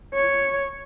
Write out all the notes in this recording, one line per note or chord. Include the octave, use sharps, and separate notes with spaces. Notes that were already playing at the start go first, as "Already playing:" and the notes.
C#5